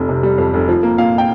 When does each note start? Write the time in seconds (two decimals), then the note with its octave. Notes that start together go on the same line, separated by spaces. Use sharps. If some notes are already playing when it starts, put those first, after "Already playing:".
Already playing: F1 F2 G3
0.09 C3
0.23 G3
0.38 F2
0.54 F1
0.69 F3
0.83 A#3
0.98 A#2 F5
1.18 G5